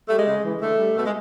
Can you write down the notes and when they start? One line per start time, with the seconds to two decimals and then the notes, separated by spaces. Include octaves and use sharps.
0.08 G3 A3
0.18 G#3
0.27 C#3
0.44 E3 G#3
0.61 D3 A3
0.79 G3
0.96 B2 A3
1.05 G#3